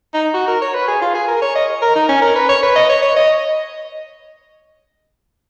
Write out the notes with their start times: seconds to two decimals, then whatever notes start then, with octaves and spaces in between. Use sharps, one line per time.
0.14 D#4
0.34 F#4
0.48 A#4
0.62 C#5
0.74 B4
0.88 G#4
1.02 F4
1.15 G#4
1.28 A#4
1.42 C#5
1.56 D#5
1.82 A#4
1.95 D#4
2.09 C#4
2.22 A#4
2.35 B4
2.49 C#5
2.63 B4
2.76 D#5
2.89 C#5
3.02 C#5
3.16 D#5